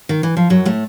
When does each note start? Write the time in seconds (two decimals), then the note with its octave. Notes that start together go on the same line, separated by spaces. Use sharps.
0.09 D#3
0.23 E3
0.37 F3
0.50 F#2 F#3
0.66 A2 A3